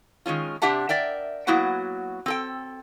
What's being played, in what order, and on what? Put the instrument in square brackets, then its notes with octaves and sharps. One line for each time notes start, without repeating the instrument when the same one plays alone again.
[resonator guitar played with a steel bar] D#3 G#3 C#4 F4
C3 D4 G4 E5 F#5 A5
A#4 D5 E5 G5
F#3 A#3 B3 E4 F#4 F#5
C4 A4 G5